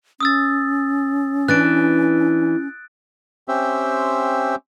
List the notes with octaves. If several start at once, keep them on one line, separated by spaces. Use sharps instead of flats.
C#4 D#6 E6 A6
E3 D4 F#6 A6 D7
C4 C#4 G4 C5 E5